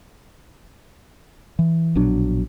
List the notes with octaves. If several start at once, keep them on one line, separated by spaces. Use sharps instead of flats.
E3
A#1 B2 F#3 D4